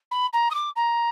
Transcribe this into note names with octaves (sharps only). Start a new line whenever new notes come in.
B5
A#5
D#6
D6
A#5